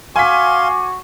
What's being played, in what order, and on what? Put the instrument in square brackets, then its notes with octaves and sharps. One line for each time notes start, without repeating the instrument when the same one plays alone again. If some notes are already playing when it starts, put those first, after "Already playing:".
[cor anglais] F#4 [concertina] F5 C6 [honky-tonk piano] G#5 B6 [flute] D6